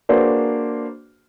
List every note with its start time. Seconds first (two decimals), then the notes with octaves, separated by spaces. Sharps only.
0.09 A#3 D4 F#4 G#4 B4 C5